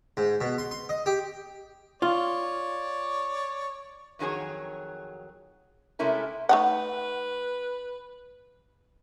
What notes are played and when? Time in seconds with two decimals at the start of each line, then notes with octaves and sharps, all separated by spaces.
0.17 G#2
0.41 B2
0.58 C6
0.71 C6
0.89 D#5
1.06 G4
2.02 F4 C#5 D5
4.19 F2 D#3 F#3 G#4 C#5
5.99 C3 G#3 A3 C#4 E4 A#4
6.49 A3 D#4 B4 F#5